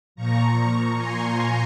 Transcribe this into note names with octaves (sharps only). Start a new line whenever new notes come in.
A#2 F3 A#5 C#6
G#5 C6